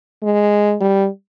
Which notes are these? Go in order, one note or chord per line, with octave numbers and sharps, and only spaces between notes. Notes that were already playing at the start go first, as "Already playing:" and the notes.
G#3
G3